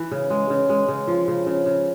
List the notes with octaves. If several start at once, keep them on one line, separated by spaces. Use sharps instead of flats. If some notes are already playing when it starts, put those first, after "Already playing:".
Already playing: E3
C#3
G#3
C#3
G#3
C#3
F3
C#3
C#3
C#3